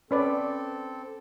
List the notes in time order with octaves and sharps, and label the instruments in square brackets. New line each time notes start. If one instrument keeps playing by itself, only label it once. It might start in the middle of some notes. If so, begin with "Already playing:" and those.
[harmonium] C4 A4 [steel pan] C#4 B4 D5